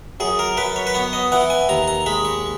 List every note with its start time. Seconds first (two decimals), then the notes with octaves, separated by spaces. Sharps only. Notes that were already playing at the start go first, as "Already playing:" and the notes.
0.20 F#2 G#4
0.39 A#4
0.57 F#2 B4
0.76 C#5
0.87 B4
0.94 B3 C#5
1.13 D#5
1.32 E3 F#5
1.50 G#5
1.69 D#2 A#5
1.88 A#5
2.06 G#3 B5
2.25 C#6